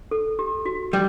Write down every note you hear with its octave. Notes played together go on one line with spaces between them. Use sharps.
A4
G4
F#4
G3